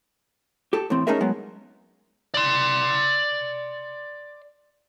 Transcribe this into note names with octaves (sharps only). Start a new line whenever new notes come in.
G4 A4
A2 E3 C4
A3 C#4 D#4 G#4 A#4 E5
F#3 G#3 B3
D5 C6